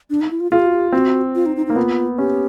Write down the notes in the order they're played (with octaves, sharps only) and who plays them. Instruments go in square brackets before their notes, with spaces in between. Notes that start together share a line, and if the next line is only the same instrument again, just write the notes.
[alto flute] D4
D#4
E4
F4
[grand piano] F4 [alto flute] G#4
[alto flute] G4
F#4
G4
[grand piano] C4 [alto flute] F#4
[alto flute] F4
D#4
D#4
D#4
[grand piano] A#3
[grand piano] B3 [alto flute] F4
[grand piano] C#4 [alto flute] G4